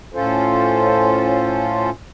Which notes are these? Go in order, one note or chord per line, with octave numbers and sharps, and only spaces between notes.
A2 C#4 F4 A4 C5